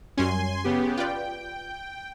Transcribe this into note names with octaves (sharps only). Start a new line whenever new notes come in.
F#2 G3 C#4 G#5 C6
C#3 B3 G4
F4 B4 D5 G5